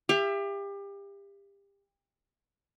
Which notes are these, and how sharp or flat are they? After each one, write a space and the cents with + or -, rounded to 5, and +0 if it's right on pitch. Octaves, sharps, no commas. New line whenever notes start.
G4 +30 E5 +35